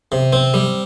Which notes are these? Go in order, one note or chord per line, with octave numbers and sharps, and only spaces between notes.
C3
C4
G3